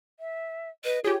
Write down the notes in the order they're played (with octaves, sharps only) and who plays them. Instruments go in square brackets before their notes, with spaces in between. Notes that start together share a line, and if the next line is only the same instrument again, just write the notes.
[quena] E5
[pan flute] B4 [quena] D#5
[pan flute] F4 [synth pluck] G4 G#4 [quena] C#5